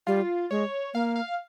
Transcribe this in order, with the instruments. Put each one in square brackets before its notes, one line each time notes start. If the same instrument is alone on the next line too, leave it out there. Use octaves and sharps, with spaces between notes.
[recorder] G3 [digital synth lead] F4
[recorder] G#3 [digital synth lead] C#5
[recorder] A#3 [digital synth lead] F5
[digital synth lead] F5